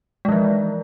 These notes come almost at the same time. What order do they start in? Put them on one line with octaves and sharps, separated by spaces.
G#3 E3 F3